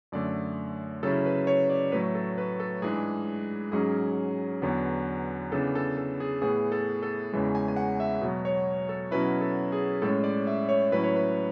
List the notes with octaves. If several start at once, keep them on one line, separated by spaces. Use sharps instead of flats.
F#2 D3 A3 D5
C#3 F#3 C#4 E4 A4
B4
C#5
D5
A2 F#3 A3 B4
A4
B4
A4
G#2 E3 G#3 D4 G#4
G#2 F#3 C#4 G#4
E2 D3 F#3 B3
C#3 E3 B3 D4 A4
A4
A4
G#4
A2 E3 B3 G#4
A4
A4
E2 C#3 E3 G#3
G#5
G#5
F#5
E5
B2 F#3 B3
C#5
A4
B2 F#3 C#4 E4 B4
A4
G#4
A2 G#3 C#4 A4
D5
E5
C#5
A2 F#3 C#4 E4 B4
C#5
B4